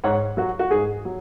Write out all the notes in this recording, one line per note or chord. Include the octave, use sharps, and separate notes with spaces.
G#2 C#5 F#5
F#3 F#4
F#4
G#2 G#4
F#3